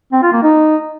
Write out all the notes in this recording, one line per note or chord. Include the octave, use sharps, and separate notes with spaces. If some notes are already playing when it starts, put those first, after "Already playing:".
C4
F4
A#3
D#4